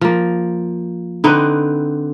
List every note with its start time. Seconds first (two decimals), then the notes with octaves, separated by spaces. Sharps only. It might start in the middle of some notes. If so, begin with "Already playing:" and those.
0.01 F3 A#3
1.24 D3 C4 D#4 B4